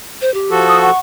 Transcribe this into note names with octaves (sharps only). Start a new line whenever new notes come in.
C5
G4
F3 F#4 A4
D#6
F#5 C#6